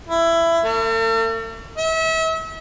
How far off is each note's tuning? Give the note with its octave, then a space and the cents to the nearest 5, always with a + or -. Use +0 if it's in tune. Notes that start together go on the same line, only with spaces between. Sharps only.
E4 +20
A3 +45
E5 -35